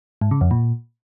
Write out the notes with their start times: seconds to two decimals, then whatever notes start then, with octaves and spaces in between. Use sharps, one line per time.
0.21 G#2
0.31 C#3
0.41 F2
0.51 A#2